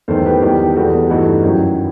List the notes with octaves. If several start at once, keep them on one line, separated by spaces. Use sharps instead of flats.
E2 D#3 A3 A4 C5
G4 B4
E2 D#3 G3
E2 B2 G3 F#4 A4
G2 E3 A3 D#4 F#4
D#4
F#2 D#3 F#3 E4